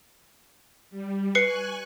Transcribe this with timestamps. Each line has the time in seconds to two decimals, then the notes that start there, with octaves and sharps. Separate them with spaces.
0.90 G3
1.35 B4 G#5 C#6 F#6 C7 C#7